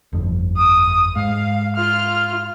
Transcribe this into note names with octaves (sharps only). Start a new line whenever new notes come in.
G1 F2
D#6
G#2 F5
F4 F6